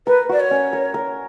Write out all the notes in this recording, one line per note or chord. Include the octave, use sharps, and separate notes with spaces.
A#4 B4
F#4 D5
C#5
C#4
A#4
A#4